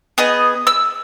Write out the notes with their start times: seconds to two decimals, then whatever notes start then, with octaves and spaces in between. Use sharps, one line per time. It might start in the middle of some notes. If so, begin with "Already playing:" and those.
0.18 B3 G#4 D#5
0.67 E6